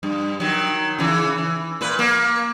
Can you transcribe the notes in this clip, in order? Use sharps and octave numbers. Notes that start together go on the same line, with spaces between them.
G2
D#3 F#3
C#3 E3
E3
A#2 B4
A#3